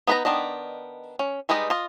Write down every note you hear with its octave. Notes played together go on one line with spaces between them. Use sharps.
B3 D#4 B4 C5 A#5
D#3 B3 D4 D#5
C#4
G3 G#3 D#4 B4 D#5
F4 D#5